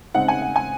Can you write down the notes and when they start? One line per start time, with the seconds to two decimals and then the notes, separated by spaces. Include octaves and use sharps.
0.14 C#3 G#3 C4 D#4 F#5
0.28 G#5
0.42 F#5
0.56 G#5